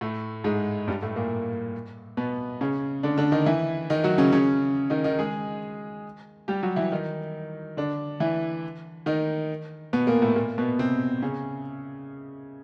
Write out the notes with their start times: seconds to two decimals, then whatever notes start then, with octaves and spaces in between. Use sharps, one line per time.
0.01 A2 A3
0.44 G#2 G#3
0.87 G2 G3
1.02 A2 A3
1.16 A#2 A#3
2.17 B2 B3
2.61 C#3 C#4
3.03 D3 D4
3.17 D3 D4
3.32 D#3 D#4
3.46 E3 E4
3.90 D#3 D#4
4.04 F#3 F#4
4.18 C#3 C#4
4.32 C#3 C#4
4.90 D#3 D#4
5.04 D#3 D#4
5.19 G#3 G#4
6.48 G3 G4
6.63 F#3 F#4
6.76 E3 E4
6.92 D#3 D#4
7.77 D3 D4
8.20 E3 E4
9.06 D#3 D#4
9.93 B2 B3
10.07 A#2 A#3
10.22 A2 A3
10.36 A#2 A#3
10.58 B2 B3
10.79 C3 C4
11.22 C#3 C#4